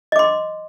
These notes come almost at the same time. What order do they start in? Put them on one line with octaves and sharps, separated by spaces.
D#5 D6 C6